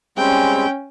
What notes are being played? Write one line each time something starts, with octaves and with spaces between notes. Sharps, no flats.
G3 G#3 C4 C#4 G5